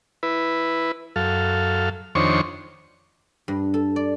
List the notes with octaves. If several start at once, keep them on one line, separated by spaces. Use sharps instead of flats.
E4 B4
F#2 A4 F5
F2 D#3 D4 C5 C#5 C#6
G2
A4
D5